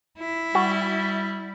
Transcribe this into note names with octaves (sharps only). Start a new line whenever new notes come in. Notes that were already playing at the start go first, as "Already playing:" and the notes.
E4
G3 F#4